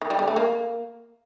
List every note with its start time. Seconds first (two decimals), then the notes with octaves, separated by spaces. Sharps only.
0.01 D#3
0.10 G3
0.19 D3
0.28 A3
0.36 A#3